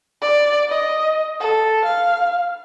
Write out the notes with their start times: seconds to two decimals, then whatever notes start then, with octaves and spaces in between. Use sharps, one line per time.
0.21 D5
0.69 D#5
1.40 A4
1.85 F5